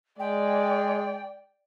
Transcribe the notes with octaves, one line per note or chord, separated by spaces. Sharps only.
G#3 D5 G5